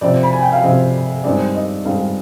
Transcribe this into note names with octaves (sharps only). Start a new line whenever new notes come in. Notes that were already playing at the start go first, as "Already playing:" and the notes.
C3 F3 C4 D5
B5
G#5
G5
F5
C3 F3 C4 D#5
G2 D#3 G#3 C4 D5
D#5
G2 D#3 G#3 C4 F5